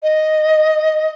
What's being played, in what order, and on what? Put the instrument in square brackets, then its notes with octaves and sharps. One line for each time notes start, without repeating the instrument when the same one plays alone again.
[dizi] D#5